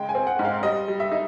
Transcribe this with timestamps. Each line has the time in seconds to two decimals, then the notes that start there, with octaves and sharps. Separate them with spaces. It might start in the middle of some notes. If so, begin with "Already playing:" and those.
Already playing: C#3 G#3 G5
0.09 G#5
0.15 C4
0.27 F#5
0.39 G#2
0.45 F5
0.63 G3 D#5
0.88 G3
1.00 E5
1.12 D#4